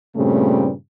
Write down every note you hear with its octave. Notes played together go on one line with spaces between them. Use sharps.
G2 A#2 C#3 G3 A3 C4